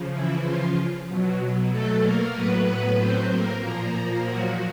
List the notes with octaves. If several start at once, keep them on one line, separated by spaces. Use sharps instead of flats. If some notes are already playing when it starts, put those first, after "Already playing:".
Already playing: C#3 F3
E3 E4
F3 F4
B2 F#3
A3 A4
A#3 A#4
A2 F#3 B3 B4
C4 C5
A#3 A#4
A#2 F3
F#3 F#4